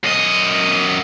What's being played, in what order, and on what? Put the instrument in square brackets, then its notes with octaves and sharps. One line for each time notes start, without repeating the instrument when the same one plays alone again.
[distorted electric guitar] F#2 D#5